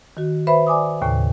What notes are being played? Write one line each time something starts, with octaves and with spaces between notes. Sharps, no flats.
D#3 F#4
B4 C5 E5 B5
D5 G#5 D6 D#6
D#2 A2 C#3